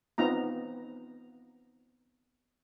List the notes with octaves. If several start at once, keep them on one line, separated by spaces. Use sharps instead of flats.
B3 C4 D#4 F4 A#5